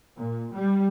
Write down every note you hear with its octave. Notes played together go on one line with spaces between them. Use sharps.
A#2
G3